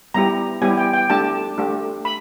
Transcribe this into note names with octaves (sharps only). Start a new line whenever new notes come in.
G3 B3 E4 G4 A#5
G3 B3 E4 G4 G#5
G5
G5
A3 D4 G4 A5
A3 D4 G4
B5